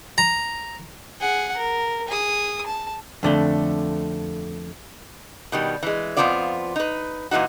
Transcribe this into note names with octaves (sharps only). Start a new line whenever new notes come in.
A#5
G#4 F#5
A#4
G#4 D#6
A5
F2 D3 A3
B2 D#3 G3
E3 G#3
F2 D#3 F3 B3 F4 D5
D#4 B4
A#2 D#3 E3 D#4 F#4